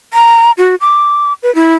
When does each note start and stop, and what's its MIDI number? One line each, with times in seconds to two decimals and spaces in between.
0.14 0.51 82
0.58 0.75 66
0.81 1.33 86
1.43 1.53 71
1.55 1.74 64